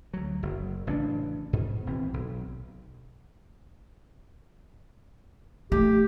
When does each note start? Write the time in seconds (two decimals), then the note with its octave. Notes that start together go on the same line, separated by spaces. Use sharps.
0.14 D2 F#3
0.43 F#1
0.87 A1 C#3 C#4 D4
1.53 G#2 B2
1.86 G#1 B2 E3 C4
2.14 B1
5.72 A3 G4